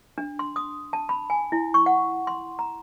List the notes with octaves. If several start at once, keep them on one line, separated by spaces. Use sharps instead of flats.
D4
C6
D#6
A5
B5
G#5
E4
C#6
F#5
C6
A#5